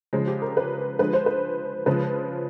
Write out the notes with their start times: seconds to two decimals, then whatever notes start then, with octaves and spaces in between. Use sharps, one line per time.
0.13 C#3 F3 G#3
0.28 G4
0.42 A#4
0.57 B4
0.99 D3 F3 G#3 B4
1.13 C5
1.26 B4
1.86 C#3 F3 G#3 B4